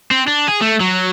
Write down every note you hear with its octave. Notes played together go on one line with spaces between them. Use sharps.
C4
D4
G#4
A3
F#3